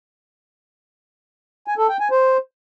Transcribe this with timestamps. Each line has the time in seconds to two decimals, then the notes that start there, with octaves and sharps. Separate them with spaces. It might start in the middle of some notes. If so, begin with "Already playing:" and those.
1.67 G#5
1.78 A4
1.89 G5
2.00 G#5
2.11 C5